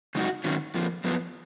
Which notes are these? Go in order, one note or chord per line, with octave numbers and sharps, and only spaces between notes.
F#2 C#3 G#3 D#4 F#4
G#2 D#3 F#3 C#4
F2 F3 A#3
F#2 F3 B3